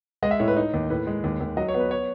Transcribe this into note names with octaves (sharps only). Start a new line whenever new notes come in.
G#3 D#5
E5
A2 C#5
B4
D#4
D#2
A2 B4
G#3
D#2
D#2
F#3 D#5
C#5
B3
B4
C#5